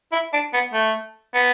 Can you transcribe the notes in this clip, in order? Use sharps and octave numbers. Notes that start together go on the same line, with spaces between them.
E4
D4
B3
A3
B3